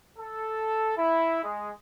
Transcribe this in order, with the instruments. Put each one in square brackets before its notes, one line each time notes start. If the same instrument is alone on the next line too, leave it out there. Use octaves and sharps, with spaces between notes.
[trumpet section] A4
E4
G#3